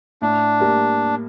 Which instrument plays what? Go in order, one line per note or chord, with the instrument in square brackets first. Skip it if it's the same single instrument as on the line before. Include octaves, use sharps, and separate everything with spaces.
[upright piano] A2 [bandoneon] D4
[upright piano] G3 A#3